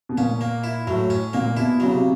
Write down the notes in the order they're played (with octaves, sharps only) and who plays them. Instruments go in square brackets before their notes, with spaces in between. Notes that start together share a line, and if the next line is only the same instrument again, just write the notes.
[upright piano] B2
[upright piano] A#2 [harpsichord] C#4
[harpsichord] A#3
E4
[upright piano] A2 [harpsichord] F#3
[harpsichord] C#4
[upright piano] A#2 [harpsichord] A#3
[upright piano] B2 [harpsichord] E4
[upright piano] C#3 [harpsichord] F#3
[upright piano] C3